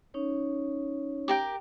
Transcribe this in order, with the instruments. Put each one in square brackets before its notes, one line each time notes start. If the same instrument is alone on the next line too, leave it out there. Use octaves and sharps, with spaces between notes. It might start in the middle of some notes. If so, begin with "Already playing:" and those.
[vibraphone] C#4 D#4 C#5
[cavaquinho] G4 A#4 G5